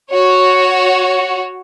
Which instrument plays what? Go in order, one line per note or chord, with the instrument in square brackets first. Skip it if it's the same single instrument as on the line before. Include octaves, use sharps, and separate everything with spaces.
[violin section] F#4 C#5